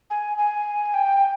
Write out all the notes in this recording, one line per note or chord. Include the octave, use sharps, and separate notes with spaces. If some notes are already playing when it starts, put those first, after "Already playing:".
G#5
G#5
G5